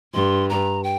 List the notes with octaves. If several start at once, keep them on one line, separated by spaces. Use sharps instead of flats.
G2 C6
A#5
G5